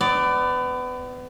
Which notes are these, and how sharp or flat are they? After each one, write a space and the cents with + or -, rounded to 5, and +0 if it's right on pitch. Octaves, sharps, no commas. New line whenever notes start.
B3 +30 D5 +0